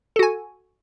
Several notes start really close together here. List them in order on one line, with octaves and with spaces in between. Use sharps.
A4 F#4 G#5